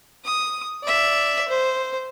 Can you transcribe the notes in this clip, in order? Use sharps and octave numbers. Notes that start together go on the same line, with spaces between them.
D#6
D5 E5
C5